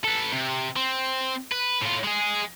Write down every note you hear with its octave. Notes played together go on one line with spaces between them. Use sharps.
A4 B4
C3
C4
B4
A2 F4
G#3 G#4